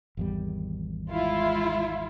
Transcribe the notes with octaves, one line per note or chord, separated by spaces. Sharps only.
G#1 E2 G3
G#3 E4 F4